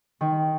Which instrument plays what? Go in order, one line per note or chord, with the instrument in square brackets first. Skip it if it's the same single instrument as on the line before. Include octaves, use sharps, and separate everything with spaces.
[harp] D#3